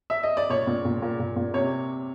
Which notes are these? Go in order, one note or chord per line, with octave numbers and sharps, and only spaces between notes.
E5
D#5
D5
A#2 C#5
A#2
A#2
A#2
A#2
A#2
C3 C#5